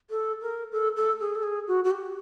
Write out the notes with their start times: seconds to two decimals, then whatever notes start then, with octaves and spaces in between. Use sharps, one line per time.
0.10 A4
0.42 A#4
0.72 A4
0.96 A4
1.20 G#4
1.36 A4
1.43 G#4
1.68 F#4
1.84 F#4
1.91 G4